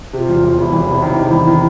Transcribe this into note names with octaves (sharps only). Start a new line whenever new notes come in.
C3 F4 G4
E1
E1
E2 E4
E1
C3
D#3
C3
E1
D#3